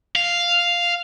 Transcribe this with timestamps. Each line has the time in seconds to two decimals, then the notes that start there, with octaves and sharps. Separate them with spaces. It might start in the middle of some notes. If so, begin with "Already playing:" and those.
0.16 F5